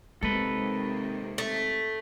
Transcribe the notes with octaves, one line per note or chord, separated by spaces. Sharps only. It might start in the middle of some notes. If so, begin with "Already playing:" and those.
C3 D#3 G#3 A#3 A4 B4
A3